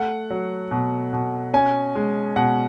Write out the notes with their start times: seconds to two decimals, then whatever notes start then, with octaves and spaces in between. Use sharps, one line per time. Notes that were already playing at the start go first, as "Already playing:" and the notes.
Already playing: A3 F#5
0.30 F#3
0.71 B2
1.13 B2
1.54 C#4 G#5
1.95 G#3
2.36 B2 F#5